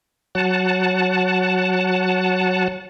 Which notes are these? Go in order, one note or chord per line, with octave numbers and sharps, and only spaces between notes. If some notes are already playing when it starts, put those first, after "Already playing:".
F#3 F#5 A5